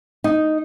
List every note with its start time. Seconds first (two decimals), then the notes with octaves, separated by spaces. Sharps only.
0.24 D#4